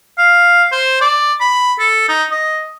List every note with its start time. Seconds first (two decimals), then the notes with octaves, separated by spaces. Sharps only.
0.18 F5
0.72 C5
1.01 D5
1.40 B5
1.79 A4
2.09 D#4
2.31 D#5